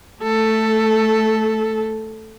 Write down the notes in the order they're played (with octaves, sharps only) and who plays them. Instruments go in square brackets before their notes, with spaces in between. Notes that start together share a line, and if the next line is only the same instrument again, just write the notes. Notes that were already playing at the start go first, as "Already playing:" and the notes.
[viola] A3 A4